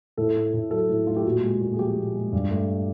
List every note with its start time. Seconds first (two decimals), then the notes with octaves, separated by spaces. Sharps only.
0.17 A2 A4
0.36 A3
0.54 A2
0.71 F#3 A4
0.89 A2
1.07 A3 F4
1.16 G4
1.25 A#2 F#4
1.43 G#3
1.61 A#2
1.74 G#4
1.79 F3 G4
1.97 A#2
2.15 G#3
2.32 G2
2.50 A3